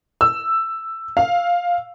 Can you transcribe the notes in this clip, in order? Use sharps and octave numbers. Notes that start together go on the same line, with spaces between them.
E6
F5